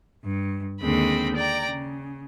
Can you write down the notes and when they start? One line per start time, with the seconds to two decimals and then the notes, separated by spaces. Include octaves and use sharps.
0.24 G2
0.81 D#2 D3 G#3 C4 B5
1.36 D5 G5 A#5
1.67 C#3